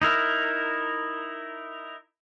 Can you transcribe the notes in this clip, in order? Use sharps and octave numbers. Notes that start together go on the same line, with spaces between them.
D#4 E4 A#4